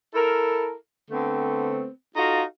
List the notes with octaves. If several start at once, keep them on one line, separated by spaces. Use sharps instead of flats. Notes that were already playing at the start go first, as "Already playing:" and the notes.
E4 A4 A#4
D3 A3 B3 C4
D#4 F4 F#4 A4 F5